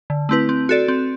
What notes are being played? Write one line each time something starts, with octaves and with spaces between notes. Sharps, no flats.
D3
A3 C4 E4 B4
C4
F#4 A4 D5
C4